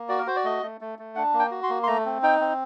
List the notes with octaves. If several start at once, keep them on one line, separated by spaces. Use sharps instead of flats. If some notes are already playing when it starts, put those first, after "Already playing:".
Already playing: A#3
F#4 D5
A#4
F#4 C5
D5
A3 D#5
A3
A3
A3
D4 F#5
A#3
G5
F#4
C6
A#3
C6
A3 A#5
C4
D#4 G5
C4